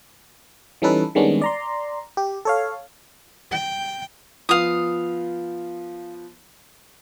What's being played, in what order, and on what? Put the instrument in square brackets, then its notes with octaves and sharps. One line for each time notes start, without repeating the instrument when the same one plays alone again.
[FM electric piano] E3 G3 C#4 D#4 A4 B4
D#3 G3 G#3 B3 C#4 D4
D5 A#5 C6
G4
A4 C#5 F5
[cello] G5
[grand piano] F3 B3 [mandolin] F5 D#6